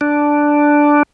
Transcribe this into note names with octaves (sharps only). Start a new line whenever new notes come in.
D4